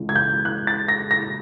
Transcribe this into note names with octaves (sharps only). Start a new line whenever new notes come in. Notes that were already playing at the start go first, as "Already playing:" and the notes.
Already playing: C#2 C#3 E3
G#6
G6
F#6
A6
A#6
A#6